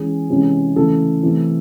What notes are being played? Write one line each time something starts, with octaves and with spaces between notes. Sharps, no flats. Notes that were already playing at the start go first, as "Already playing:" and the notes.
Already playing: E3 G#3 C#4 G#4
C3 E3 G#3 C#4
C#3 E3 A3 A4
C3 E3 A3 C4